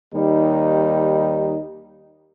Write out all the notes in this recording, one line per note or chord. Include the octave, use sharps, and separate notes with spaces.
D#2 G3 D#4